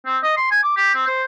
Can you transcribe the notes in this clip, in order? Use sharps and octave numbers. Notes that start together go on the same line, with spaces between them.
C4
D#5
C6
G#5
D6
G4
C4
C5